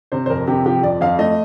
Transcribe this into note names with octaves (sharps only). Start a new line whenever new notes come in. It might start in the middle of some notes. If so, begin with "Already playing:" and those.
C3 C5
C5
F2 A#4
C3 G4
F3 G4
F2 D5
F2 F5
A3 D#5